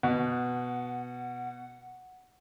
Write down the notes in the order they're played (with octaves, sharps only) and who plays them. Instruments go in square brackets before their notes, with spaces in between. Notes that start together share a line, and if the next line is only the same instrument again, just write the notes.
[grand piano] B2 [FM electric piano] F#5